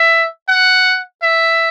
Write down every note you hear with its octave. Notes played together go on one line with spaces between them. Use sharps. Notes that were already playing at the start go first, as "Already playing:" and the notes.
Already playing: E5
F#5
E5